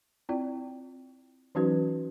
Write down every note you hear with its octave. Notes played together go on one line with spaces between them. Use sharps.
C4 E4 F4 D5 G5
E3 F#3 C#4 D#4 F#4 B4